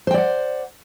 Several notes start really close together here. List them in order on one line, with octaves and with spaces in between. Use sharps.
C5 G5 D5 F#5